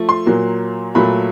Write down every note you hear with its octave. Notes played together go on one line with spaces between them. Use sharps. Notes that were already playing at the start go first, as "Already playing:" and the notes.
Already playing: F3 A3
C6
A#2 F#3 A#3
A#2 F#3 A3 B5